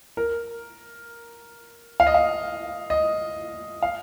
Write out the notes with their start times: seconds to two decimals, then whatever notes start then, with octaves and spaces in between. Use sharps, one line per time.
0.17 A#4
2.00 F5
2.07 D#5
2.14 F5
2.90 D#5
3.82 F5